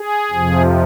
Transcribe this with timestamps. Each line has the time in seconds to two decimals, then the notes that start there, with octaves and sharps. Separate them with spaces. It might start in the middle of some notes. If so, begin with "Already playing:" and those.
Already playing: G#4
0.31 F2 C3 F3